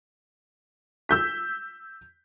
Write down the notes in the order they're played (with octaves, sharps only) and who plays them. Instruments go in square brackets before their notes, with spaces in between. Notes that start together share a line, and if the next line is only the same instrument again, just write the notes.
[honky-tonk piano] E6 G6 B6